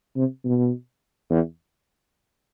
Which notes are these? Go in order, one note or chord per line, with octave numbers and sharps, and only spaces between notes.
C3
B2
E2